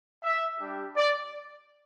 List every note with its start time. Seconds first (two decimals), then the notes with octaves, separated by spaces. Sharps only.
0.23 E5
0.60 G3 D4 G4
0.97 D5